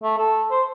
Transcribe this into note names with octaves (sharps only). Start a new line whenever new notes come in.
A3
A4
C5